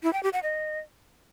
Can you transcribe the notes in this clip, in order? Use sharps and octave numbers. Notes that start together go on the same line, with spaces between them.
E4
G5
G4
F#5
D#5